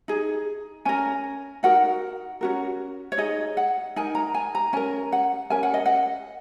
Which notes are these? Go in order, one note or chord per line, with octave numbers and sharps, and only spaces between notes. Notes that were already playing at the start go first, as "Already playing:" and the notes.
D#4 G#4
C#4 A#4 G#5
D#4 F#4 A#4 F#5
C#4 F#4 A#4
C#5
D#4 G#4 D#5
F#5
D#4 A#4 G#5
A#5
G#5
A#5
C#4 A#4 G#5
F#5
C#4 A#4 G#5
F#5
D#5
F#5